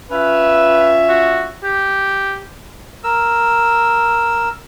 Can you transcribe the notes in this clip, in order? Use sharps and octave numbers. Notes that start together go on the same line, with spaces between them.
C#4 F4 B4 E5
F#4
G4
A#4 E6